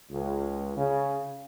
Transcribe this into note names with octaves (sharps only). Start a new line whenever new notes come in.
C#2
C#3